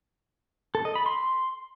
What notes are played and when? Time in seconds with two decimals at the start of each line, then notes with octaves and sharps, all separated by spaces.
0.75 A4
0.85 D#5
0.96 B5
1.06 C6